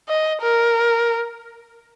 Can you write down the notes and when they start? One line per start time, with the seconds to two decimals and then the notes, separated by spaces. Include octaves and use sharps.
0.09 D#5
0.42 A#4